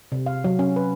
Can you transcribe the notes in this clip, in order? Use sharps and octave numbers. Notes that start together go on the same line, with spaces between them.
C3
F5
F#3
C#4
B4